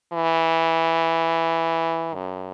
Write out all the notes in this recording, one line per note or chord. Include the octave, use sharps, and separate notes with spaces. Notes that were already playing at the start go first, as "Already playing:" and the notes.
E3
F#2